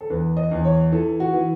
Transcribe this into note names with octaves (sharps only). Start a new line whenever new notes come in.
A4
E2 B4
D#5
E2
C#5
E3 A4
F#4
E3